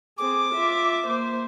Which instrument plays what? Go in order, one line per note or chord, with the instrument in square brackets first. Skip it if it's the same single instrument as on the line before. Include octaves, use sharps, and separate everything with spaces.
[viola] C4 G#4 [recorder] D6
[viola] F4 E5
A#3 C5